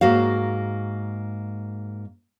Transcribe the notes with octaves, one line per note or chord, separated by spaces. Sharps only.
G#2 A#3 F#4 F5